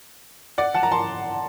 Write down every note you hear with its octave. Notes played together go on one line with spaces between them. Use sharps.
D5 F#5
F#5 A5
A#5
A5 C6